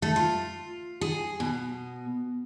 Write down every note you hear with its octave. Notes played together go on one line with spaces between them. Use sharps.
A3
F4
G#4
B2